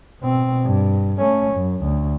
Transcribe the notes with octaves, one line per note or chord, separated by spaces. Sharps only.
B2 C4
G2
A3 C#4
F#2
D2